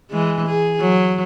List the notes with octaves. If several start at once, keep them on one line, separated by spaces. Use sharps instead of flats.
E3 G#3
G#4
F#3